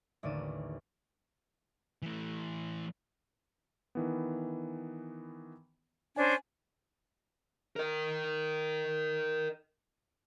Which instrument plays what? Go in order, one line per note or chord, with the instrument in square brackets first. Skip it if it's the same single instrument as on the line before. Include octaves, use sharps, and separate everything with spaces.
[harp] A1 D#2 D3 D5 D#7 E7
[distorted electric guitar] E3 A3
[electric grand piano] D#3 E3 B3
[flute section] C#4 D4 C5 [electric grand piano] G#5
[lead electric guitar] A#4 D#5